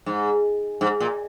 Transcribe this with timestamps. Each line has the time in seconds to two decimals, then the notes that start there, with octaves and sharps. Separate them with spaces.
0.06 G#2
0.81 G#2
1.00 A#2